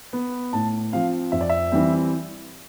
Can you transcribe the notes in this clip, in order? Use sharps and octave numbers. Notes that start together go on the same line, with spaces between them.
B3
A2 A5
F3 C4 F5
F2 E5
D5
E5
E3 G3 C4